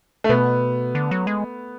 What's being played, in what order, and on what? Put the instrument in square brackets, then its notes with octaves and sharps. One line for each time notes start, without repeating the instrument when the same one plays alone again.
[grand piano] A3
[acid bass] B2 [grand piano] B3
[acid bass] D3
F#3
G#3